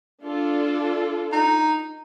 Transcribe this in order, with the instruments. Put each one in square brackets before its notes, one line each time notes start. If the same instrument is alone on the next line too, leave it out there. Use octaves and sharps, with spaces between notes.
[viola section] D4 F4 A4
[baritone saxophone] D#4